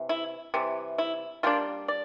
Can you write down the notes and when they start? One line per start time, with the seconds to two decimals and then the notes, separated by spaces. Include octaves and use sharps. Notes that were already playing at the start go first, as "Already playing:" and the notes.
Already playing: C3 E3
0.09 E4
0.54 C3 E3 G3
0.98 E4
1.43 G3 A#3 D4 F4
1.88 D5